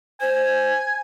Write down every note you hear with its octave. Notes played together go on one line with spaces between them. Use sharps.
C5 G#5